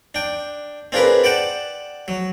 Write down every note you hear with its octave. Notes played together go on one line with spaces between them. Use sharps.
D4 G5
C4 D4 F4 G#4 A#4 B4
D5 F#5 G5 A5
F#3